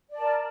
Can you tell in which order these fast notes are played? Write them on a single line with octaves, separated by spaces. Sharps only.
D5 A5 A#4